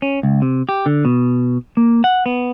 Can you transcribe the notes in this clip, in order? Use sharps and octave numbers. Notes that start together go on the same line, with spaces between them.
C#4
C#2
C3
G4
D3
B2
A#3
F#5
B3